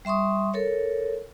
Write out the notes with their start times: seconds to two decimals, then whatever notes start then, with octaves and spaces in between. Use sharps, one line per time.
0.05 G3 E5 C6 C#6 D#6
0.54 A4 A#4 C#5